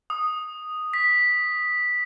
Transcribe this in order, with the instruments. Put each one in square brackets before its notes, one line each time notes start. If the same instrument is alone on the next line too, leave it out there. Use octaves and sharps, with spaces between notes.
[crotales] D#6
B6